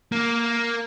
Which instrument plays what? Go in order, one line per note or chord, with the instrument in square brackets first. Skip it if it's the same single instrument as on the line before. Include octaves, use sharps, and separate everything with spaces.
[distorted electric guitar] A#3